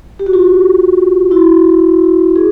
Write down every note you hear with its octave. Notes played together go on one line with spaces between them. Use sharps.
G4
F#4
F4 G4
E4 F#4
G#4